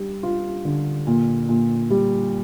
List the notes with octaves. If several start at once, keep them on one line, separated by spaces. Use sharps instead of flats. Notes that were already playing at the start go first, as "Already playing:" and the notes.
Already playing: G3 D4
F4
D3
A#2
A#2
G3